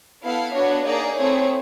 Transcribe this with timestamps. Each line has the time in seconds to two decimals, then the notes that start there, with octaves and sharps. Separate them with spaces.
0.23 B3 E4 A4 F5
0.54 B3 D4 F#4 C#5
0.85 A#3 D#4 G#4 D5
1.16 A3 C4 E4 G#4 C#5